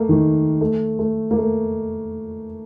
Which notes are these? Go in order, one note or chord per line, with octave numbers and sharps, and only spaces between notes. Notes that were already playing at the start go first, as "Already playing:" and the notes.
Already playing: A3 A#3
D#3
A3
A3
A#3
A3